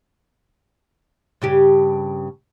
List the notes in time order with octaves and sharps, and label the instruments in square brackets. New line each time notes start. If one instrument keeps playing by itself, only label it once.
[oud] G2 C#3 G4